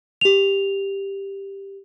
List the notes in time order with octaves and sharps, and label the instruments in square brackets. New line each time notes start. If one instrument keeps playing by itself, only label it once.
[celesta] G4 F7